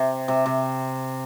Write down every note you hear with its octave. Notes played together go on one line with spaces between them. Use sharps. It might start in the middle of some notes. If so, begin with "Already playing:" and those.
Already playing: C3
C3
C3